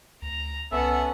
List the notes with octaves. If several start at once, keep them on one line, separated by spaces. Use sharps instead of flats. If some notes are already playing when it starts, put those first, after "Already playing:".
D2 A#5
C2 B3 C#4 A4 E5 F#5